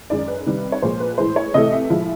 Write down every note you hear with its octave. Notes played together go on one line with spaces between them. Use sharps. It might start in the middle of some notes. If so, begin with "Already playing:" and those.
F#2 D#3 G#3 D5
B4
C3 D#3 G3
C#5
A#2 F3 G#3 C5
B4
A2 E3 G#3 C5
C#5
C3 E3 A3 D#5
E5
A2 F3 G#3